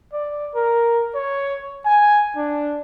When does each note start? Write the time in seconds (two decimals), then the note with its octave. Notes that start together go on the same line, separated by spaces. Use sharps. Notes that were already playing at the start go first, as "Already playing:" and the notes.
0.13 D5
0.55 A#4
1.15 C#5
1.85 G#5
2.36 D4